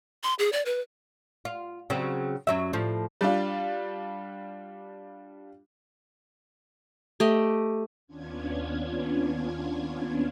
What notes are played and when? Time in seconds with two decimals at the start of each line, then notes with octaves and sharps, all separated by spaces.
0.23 C6
0.39 G#4
0.52 D5
0.66 B4
1.45 F4
1.90 C#3 F#3 C4
2.47 F#2 F#3 E5
2.73 A2 F3
3.21 G3 D4 F4
7.20 A3 G4 D#5
8.07 D#2 B3 C#4 D4 F4 G#6